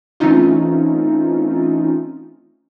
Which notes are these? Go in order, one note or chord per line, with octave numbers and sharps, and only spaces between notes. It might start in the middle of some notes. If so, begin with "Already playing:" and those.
E3 A3 C4 C#4 D#4 F4